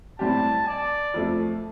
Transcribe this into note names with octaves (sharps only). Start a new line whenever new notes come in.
A2 G3 C4 G4 A5
D5
F2 F3 A3